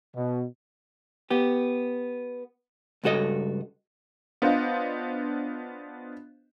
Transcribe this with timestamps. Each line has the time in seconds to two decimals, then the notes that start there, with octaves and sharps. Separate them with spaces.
0.16 B2
1.30 B3 G4
3.04 C#2 G2 F#4 A4 D#5
4.42 B3 D4 F4 C5 D#5